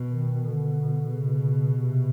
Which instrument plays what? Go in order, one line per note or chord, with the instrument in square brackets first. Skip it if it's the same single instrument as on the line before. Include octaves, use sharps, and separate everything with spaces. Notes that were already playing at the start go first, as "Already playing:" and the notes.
Already playing: [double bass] B2
[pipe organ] D#3
[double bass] B2 [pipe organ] D3
[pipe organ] C#3
C3